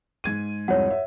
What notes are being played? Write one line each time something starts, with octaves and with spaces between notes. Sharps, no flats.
G#2 G#6 D#7
C2 F2 G#2 C#5 F#5
E5